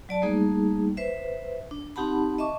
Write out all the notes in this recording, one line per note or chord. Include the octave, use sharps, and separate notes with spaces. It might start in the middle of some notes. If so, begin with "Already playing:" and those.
F#3 D5 A5
G3 A3 A#3 D#4 G#4
B4 C5 E5
D4
C4 D#4 G4 F#5 A5 B5
D#5 E5 A5 C#6 D6